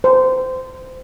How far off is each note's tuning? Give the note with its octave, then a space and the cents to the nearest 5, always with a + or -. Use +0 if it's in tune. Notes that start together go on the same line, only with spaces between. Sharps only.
C5 -20